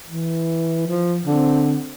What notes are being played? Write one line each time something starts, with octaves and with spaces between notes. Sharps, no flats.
E3
F3
D3 C4